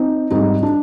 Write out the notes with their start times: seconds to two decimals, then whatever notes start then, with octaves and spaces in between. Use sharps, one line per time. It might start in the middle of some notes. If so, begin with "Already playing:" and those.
Already playing: C4 D#4
0.31 G#2 G3 C4 D#4
0.63 D4